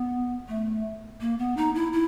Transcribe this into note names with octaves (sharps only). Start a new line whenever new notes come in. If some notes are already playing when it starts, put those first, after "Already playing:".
Already playing: B3
A3
A#3
B3
D#4
E4
E4